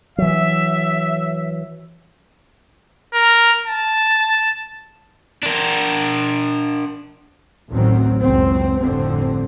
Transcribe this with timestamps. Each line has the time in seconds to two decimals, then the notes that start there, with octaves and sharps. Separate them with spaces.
0.18 E3 F#3 E5
3.14 A#4
3.66 A5
5.43 D4 A#4
7.70 A1 D2 A2 D#3 F#3 C4
8.22 F#1 C#2 C4
8.80 G1 F2 A2 D3 C4